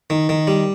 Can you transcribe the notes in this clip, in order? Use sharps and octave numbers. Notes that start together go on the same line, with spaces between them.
D#3
D#3
G3